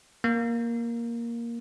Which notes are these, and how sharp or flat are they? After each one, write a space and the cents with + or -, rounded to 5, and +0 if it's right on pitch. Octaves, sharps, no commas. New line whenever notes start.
A#3 +5